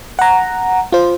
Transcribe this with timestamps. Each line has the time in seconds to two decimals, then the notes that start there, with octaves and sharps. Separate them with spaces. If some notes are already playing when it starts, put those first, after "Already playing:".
0.19 F#5 A#5
0.92 F4 C5